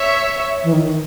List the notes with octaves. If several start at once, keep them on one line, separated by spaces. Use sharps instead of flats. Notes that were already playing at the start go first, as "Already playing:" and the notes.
Already playing: C#5 E5
E3
D#3